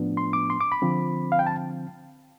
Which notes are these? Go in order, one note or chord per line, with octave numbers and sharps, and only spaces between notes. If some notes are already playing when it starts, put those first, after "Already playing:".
Already playing: A2 F3 B3 D4
C6
D6
C6
D6
B5
D3 F3 C4
F5
G5
A5